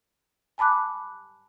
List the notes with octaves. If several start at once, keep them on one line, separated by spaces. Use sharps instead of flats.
G#5 A5 B5 D6 F#6